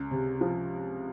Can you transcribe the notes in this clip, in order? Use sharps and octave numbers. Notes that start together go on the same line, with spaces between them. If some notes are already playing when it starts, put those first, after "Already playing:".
Already playing: C#2
C3
F3